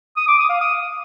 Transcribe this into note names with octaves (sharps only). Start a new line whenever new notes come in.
D#6
D6
D#6
F5
D#6